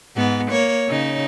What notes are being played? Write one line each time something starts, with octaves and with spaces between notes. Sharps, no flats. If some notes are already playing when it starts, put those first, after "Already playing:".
G#2 B3
A#3 C#5
C#3 D#4